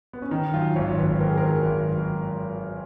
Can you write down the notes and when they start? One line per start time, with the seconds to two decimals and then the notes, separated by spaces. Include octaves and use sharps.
0.13 B3
0.22 C#4
0.31 D#3 D#4
0.53 F#2 F4
0.76 G#1 C#5
0.98 G#1 B4
1.20 D#3 A#4
1.29 G#4
1.38 A#4
1.43 F#2
1.65 G#1